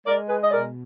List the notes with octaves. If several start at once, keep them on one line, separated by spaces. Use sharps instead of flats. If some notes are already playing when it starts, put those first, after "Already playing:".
G#3 A#4 D5
G#4 B4
D#5
B2 A#4 D5